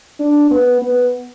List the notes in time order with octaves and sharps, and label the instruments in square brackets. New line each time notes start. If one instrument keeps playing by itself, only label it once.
[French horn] D4
B3
B3